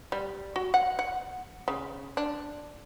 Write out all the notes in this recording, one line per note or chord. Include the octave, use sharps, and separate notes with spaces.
G3
F#4
F#5
F#5
C#3
D4